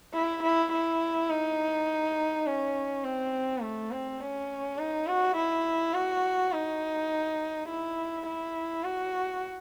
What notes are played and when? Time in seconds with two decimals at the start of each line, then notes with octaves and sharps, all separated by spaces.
0.14 E4
0.43 E4
0.72 E4
1.30 D#4
2.46 C#4
3.04 C4
3.62 A3
3.91 C4
4.21 C#4
4.78 D#4
5.07 F#4
5.36 E4
5.94 F#4
6.52 D#4
7.68 E4
8.26 E4
8.84 F#4